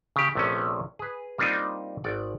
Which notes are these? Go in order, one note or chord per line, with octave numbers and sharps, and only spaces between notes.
C#3 G4
A#1 C3 A3 B3 C#4
G#4 B4
G3 A#3 C4 D4 D#4 F4
G#1 D5 F#5